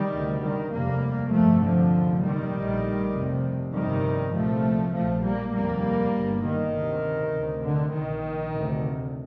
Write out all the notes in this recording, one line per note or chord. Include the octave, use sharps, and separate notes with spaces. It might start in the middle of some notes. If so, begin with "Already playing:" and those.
Already playing: D#3 G3
D2 C3
D#3
F1 D#2 G3 A#3
G1 F2 C3 F3 A3
D3 F3
F1 D#2
D#3 G3
A#1 A2
F1 F2 C3
G1 F2 C3 D#3 G3
C2 A#2 F3 A3
A#1 A2 F3 A3
G3 A#3
F1 D#2 G3 A#3
G1 G2
D#3
D2 C3
D2 C3
D3
A#1 A#2 D#3
D2 C3